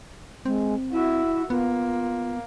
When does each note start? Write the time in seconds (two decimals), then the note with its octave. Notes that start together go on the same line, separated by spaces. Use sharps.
0.45 G#3 C4
0.92 E4 F#4 E5
1.50 A#3 B3 F4